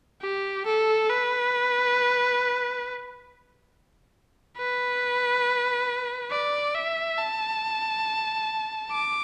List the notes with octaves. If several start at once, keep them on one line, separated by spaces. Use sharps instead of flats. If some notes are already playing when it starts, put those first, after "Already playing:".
G4
A4
B4
B4
D5
E5
A5
D6